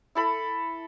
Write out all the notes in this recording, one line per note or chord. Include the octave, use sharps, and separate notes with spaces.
E4 A4 B5